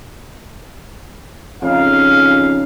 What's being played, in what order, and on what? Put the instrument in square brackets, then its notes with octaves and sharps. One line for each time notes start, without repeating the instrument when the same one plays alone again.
[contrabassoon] F2 [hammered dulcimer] C#3 D#4 G#4 [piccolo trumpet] F5